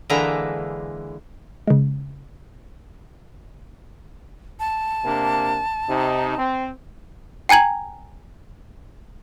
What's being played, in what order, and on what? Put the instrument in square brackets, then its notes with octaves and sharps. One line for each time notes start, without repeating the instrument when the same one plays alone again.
[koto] D3 E3 G#3 A#3 B4 A#5
[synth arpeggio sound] C#3 G#3
[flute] A5
[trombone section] C3 A#3 D4
C3 D#4
C4
[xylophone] G5 G#5 A#5 G#6 F#7